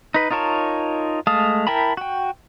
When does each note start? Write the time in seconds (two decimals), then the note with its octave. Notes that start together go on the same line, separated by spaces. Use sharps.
0.14 D#4 B4
0.31 D#4 F4 A#4 C#5 A5
1.27 G#3 A3 F5 A5 D#6
1.67 E4 A#4 G5 A5 B5
1.97 F#4 G5